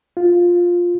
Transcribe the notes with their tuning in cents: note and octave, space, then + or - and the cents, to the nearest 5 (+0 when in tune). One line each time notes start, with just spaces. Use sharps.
F4 +5